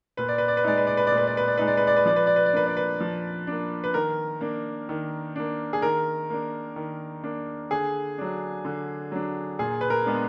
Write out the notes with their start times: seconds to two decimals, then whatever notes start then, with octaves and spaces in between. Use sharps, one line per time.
0.17 A#2 B4
0.28 D5
0.38 B4
0.48 D5
0.57 B4
0.64 G#3 D#4 D5
0.77 B4
0.87 D5
0.97 B4
1.07 D5
1.12 A#2
1.17 B4
1.27 D5
1.37 B4
1.48 D5
1.58 G#3 D#4 B4
1.67 D5
1.77 B4
1.87 D5
1.96 B4
2.06 F3 D5
2.16 B4
2.27 D5
2.36 B4
2.46 D5
2.53 A#3 D4 B4
2.67 D5
2.77 B4
3.00 F3
3.47 A#3 D4
3.84 B4
3.94 D#3 A#4
4.41 A#3 D4
4.89 D#3
5.36 A#3 D4
5.73 G#4
5.82 D#3 A#4
6.30 A#3 D4
6.76 D#3
7.24 A#3 D4
7.71 D3 G#4
8.18 F#3 D4
8.65 D3
9.12 F#3 D4
9.59 A#2 G#4
9.81 B4
9.90 A#4
10.06 G#3 B3 D4